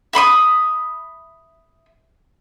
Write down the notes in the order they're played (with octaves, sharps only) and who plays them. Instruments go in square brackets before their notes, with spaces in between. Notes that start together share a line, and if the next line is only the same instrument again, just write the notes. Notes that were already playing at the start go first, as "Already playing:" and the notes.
[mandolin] E5 B5 C6 D#6